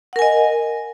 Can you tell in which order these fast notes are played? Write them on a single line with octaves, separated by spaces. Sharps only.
F#5 A#4 G#5 D#5